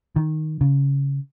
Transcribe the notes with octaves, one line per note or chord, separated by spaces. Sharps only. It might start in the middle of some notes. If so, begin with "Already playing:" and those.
D#3
C#3